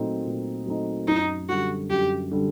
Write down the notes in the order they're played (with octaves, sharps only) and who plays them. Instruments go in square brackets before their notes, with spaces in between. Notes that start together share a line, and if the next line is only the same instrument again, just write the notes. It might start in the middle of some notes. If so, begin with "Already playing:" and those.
Already playing: [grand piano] A#2 F#3 A3 C4 D#4
A#2
F#3 A3 C4 D#4
[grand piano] F#2 [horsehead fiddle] D#4
[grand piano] D3 G3 [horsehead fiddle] F#4
[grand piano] F#2 [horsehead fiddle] G4
[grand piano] D3 G3